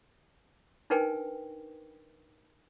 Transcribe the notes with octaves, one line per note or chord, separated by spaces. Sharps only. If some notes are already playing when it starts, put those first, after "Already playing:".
D4 D#4 A#4 B4 G5 G#5